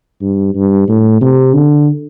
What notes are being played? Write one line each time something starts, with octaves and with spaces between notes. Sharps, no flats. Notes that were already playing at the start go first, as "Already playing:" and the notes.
G2
G2
A2
C3
D3